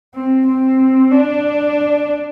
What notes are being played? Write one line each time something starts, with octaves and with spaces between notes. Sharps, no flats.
C4
C4
D4